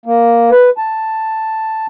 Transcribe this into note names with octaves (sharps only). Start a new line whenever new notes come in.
A#3
B4
A5